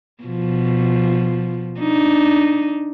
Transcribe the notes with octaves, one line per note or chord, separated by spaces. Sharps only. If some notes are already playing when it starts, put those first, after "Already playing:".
B2 F3
D4 D#4